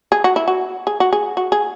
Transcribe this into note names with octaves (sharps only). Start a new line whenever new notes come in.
G#4
F#4
E4
F#4
G#4
F#4
G#4
F#4
G#4